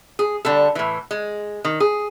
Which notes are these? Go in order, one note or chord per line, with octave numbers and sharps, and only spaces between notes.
G#4
D3 G3 A4
A2 E3
G#3
D#3
G#4